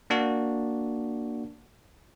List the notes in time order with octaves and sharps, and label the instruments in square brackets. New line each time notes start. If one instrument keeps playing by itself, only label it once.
[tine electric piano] A#3 D4 F#4